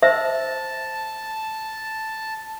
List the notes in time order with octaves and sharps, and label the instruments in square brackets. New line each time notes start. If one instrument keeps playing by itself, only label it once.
[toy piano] C5 E5 E6 [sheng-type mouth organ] A5